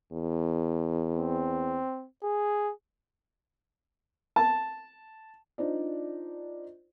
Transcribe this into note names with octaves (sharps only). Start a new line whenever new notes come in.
E2
C4
G#4
A5
D4 D#4 F4 C5 D5